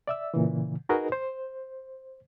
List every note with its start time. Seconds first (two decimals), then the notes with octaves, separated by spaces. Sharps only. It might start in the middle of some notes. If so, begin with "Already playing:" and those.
0.07 D5 E5 E6
0.34 A#2 C#3 E3
0.89 D#4 F#4 G#4 A#4 B4 D#5
1.12 C5